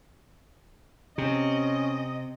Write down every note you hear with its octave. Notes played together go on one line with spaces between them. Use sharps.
C3 C#4 D#5